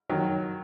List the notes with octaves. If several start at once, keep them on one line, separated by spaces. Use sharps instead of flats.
D#3 F#3